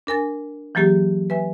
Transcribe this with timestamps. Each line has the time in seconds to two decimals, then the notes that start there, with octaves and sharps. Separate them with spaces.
0.07 D4 A#4 G#5 A6
0.75 E3 F#3 A#3 G4 G#4
1.30 B4 E5 G#5